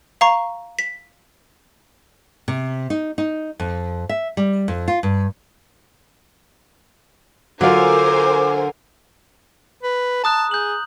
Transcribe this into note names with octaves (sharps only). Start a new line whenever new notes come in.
F5 A#5 C#6
B6
C3
D#4
D#4
F2
E5
G3
F2
F4
G2
D3 F#3 F4 A#4 C5 G#5 D6
B4
A5 A#5 D#6 F#6
G#4 G6 F#7